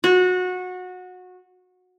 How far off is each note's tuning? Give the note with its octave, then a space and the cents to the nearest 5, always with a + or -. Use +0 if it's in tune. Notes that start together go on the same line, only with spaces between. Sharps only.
F#4 -20